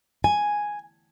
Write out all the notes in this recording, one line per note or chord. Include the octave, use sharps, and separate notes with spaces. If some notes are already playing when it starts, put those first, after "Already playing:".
G#5